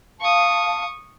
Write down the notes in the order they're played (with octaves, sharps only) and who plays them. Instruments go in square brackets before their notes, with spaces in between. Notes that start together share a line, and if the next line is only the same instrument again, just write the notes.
[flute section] F5 A5 [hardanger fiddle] C#6 D#6